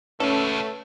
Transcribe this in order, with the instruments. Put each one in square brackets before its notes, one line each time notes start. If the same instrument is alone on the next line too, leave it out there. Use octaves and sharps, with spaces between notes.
[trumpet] A3 [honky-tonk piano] C#4 [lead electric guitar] F#4 A4 [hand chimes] B4